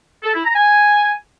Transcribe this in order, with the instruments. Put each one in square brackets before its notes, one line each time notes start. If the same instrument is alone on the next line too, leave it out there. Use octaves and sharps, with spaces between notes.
[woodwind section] A4
E4
A#5
G#5